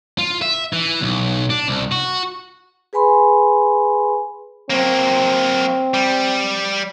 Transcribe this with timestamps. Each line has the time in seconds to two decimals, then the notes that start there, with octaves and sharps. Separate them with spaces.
0.18 F4
0.42 E5
0.73 E3
1.01 B1
1.50 D4
1.68 C2
1.92 F#4
2.93 G#4 B4 G#5 B5 C6
4.70 F#3 A#3 C4
5.94 G3